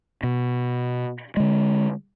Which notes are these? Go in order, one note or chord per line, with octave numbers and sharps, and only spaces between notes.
B2
D3 G#3